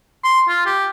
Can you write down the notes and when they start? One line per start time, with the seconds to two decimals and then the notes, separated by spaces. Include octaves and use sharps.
0.24 C6
0.49 F4
0.66 G4